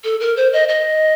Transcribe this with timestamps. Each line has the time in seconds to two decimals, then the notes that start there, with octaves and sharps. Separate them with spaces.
0.04 A4
0.20 A#4
0.37 C5
0.53 D#5
0.69 D#5